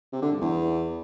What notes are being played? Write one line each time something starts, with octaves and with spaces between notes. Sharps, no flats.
C3
D3
G2
E2